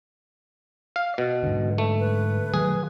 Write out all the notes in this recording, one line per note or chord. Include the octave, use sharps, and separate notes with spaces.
F5
B2
G#2 D3
A3
B4
D#3 F#3 A3 G#4